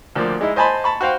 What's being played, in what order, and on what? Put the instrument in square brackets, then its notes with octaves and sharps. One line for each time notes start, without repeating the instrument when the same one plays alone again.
[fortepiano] D2 F3 A#3 D5
G#3 D#4 E4
C5 D#5 G#5 A5 B5 C6
A5 B5 C#6
F#4 C5 F5 G5